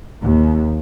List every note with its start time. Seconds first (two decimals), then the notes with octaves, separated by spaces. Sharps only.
0.22 D#2